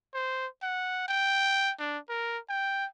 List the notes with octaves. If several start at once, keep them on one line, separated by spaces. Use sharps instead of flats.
C5
F#5
G5
D4
A#4
G5